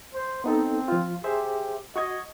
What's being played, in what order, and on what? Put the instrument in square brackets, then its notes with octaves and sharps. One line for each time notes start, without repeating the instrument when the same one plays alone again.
[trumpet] C5
[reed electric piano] B3 D#4 A4 [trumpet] C4
[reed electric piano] F3 F4
[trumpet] G4 [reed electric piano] G#4 C5 E5
[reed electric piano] F#4 C#6 G#6 [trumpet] D#5